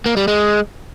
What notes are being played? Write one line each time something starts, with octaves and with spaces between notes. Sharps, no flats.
A#3
G3
G#3